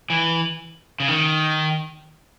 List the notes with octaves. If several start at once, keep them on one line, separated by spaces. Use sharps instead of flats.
E3
C#3
D#3